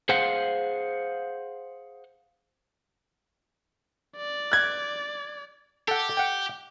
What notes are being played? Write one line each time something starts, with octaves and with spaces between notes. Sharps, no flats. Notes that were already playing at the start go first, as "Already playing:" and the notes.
G#4 C5 F5 F#5
D5
F#6 G#6
G4 A4 F#5
F#5 G5